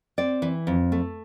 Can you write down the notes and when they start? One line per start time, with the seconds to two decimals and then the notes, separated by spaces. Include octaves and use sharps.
0.18 C4 D5
0.42 E3
0.67 F2
0.92 A3